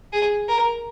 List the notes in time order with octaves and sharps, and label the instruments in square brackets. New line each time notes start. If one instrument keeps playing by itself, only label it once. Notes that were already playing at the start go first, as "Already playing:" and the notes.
[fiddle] G#4
A#4